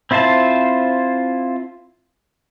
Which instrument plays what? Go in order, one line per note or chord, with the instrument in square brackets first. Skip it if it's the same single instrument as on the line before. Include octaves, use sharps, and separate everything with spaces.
[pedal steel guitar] C4 E4 F4 C5 A5